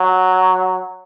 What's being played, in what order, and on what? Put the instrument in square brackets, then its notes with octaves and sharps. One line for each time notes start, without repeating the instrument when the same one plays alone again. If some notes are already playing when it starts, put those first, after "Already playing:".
Already playing: [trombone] F#3